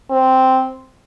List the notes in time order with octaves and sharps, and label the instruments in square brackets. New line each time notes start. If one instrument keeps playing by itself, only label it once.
[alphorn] C4